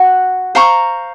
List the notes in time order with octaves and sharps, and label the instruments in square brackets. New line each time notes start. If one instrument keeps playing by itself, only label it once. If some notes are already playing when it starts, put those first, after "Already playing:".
Already playing: [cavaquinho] F#4 F#5
C5 F5 A#5 C#6